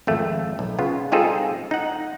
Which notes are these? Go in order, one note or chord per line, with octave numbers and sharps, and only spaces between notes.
G#1 F2 A3 E5
B1
C#3 B3 F4
G3 C4 D#4 F4 G#4 A4
D#4 F#5